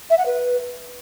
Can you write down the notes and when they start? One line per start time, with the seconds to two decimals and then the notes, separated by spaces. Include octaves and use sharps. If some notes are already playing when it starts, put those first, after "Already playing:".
0.10 E5
0.18 F#5
0.25 B4